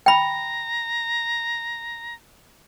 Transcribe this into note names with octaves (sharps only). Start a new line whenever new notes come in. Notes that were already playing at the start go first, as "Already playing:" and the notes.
G5 A#5 B5